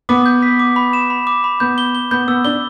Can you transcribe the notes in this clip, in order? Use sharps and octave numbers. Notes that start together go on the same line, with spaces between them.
B3 D6
G6
B6
D6
B5
E7
B5
D6
B5
B3 G6
G7
G7
B3 G6
B3 E6
D4 G7